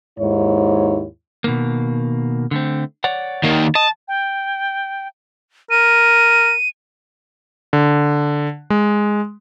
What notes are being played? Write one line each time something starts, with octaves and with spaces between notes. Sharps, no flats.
D#2 G#2 E4 C#5
B2 D#3 A#3
D3 A3 C4
C#5 D5 F#5
D#3 A#3
D#5 A5
G5
A#4 D#7
D3
G#3